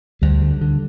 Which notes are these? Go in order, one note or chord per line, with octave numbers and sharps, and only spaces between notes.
D2 G3
D3
D3